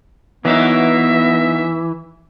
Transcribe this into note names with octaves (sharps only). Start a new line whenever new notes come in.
E3 F#3 A#3 B3 D#4 E5